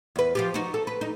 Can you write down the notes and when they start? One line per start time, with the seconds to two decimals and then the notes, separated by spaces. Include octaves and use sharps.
0.16 E2 B4
0.35 F3 F4 G4
0.54 D#4 F#4
0.74 A4
0.87 B4
1.01 D#4